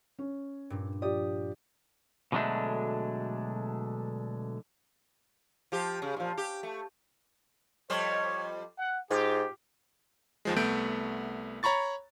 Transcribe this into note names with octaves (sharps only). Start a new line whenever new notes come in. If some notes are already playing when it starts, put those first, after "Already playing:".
C#4
G2 A#2
F3 G4 D5 D#6
B2 D3 F#3 G#3 A3 D4
F3 G4
C#3
A#2 F3
G4
A3
F2 G3 C5 C#5
F#5
G#2 F4 G4
D#2 F3 G#3
C2 A3 B3 G6 D7
C#5 A#5 B5 C#6 A6